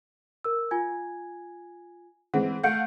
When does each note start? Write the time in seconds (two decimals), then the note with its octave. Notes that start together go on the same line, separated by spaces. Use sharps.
0.44 A#4 E6
0.71 F4 G#5 G#6
2.34 E3 G#3 C4 F#5
2.64 A3 F5 F#5 G6 C#7 D7